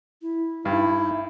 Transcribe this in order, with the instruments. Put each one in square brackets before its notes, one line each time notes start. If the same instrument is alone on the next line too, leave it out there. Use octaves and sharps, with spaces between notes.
[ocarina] E4
[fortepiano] G2 [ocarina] D#4 [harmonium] E4
[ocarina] D#4